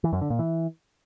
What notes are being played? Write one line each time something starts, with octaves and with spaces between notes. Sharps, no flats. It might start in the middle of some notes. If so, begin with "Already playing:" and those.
E3
F#2
D3
A#2
E3